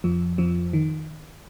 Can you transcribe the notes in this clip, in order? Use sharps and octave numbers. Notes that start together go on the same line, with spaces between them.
F2 F3
F2 F3
D#3